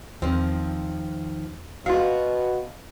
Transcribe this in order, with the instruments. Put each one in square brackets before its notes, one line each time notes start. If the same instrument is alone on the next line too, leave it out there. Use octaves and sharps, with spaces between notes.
[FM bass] E2 [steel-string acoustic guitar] D#3 F3 [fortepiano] C4
[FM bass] D1 [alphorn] B2 [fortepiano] F4 F5 [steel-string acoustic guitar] F#4